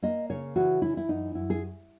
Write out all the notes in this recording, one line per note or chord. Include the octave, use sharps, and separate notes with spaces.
A#3 D#5
C#3 C#5
E3 F#4
E3 E4
E4
F#2 D#4
F#2 E4
G#4